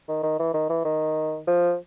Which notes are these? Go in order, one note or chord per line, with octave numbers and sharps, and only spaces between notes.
D#3
D#3
E3
D#3
E3
D#3
F3